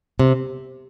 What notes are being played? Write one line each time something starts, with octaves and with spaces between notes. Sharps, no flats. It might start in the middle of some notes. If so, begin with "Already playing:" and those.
C3